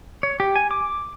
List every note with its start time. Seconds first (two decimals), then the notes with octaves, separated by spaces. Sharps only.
0.23 C#5
0.40 G4
0.56 G#5
0.71 D6